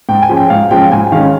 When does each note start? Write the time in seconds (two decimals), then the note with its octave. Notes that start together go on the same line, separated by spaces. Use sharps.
0.09 G#2 G5
0.22 G#5
0.29 F3 G#3 C#4
0.36 G5
0.50 G#2 F5
0.71 F3 G#3 C#4 G5
0.92 G#2 G#5
1.12 D#3 G#3 C#4 F5